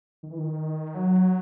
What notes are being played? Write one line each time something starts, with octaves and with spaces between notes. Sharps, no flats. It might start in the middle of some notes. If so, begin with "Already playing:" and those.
D#3
E3
D#3
F#3